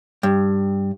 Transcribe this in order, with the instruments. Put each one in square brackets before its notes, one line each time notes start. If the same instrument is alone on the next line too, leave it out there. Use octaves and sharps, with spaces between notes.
[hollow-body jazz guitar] G2